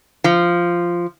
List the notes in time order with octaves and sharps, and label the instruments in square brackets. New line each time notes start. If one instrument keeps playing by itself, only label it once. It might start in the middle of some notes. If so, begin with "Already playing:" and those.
[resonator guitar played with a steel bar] F3